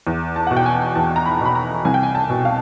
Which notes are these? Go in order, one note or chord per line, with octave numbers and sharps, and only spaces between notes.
E2
A5
B2 F#5
G5
G#5
E2 A5
A#5
B5
B2 B5
A#5
C2 G#5
G5
G#5
A5
B2
F5